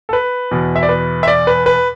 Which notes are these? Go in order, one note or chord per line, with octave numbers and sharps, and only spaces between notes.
A4
B4
E2 B2
E5
D5
B4
E5
D5
B4
B4